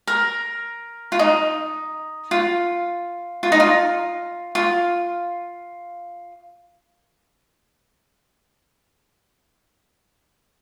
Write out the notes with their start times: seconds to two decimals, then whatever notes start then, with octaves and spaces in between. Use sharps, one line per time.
0.07 A#4
1.12 F4
1.19 D#4
2.31 F4
3.43 F4
3.52 D#4
3.60 F4
4.55 F4